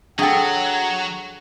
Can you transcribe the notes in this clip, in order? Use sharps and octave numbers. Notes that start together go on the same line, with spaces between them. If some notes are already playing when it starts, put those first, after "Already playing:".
F#3 D4 G#4 A4 F#5 G5